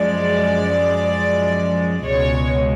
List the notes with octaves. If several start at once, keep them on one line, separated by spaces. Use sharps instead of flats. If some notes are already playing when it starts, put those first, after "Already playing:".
Already playing: F#2 F3 G#3 D5
C#2 B2 G#3 C#5